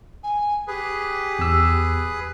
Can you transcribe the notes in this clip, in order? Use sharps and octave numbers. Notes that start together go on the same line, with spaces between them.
G#5
G4 G#4 B4
E2 E6